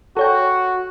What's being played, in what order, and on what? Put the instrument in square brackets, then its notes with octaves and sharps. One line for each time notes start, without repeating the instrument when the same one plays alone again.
[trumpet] F#4 [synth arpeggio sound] A4 C#5 G5